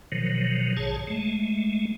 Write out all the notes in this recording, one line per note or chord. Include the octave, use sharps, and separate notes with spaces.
B2 D#3 F3 F#3
A#1 G#2 G#4 C#5 A5
G#3 A3